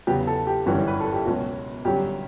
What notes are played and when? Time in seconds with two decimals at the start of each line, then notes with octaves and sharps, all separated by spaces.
0.07 E2 C#3 F#3 B3 G4
0.27 A4
0.47 G4
0.66 G1 F#2 E3 G3 C#4 F#4
0.88 B4
1.01 A4
1.13 G4
1.25 C#2 B2 F#3 C#4 F#4
1.85 G1 G2 F#3 C#4 G4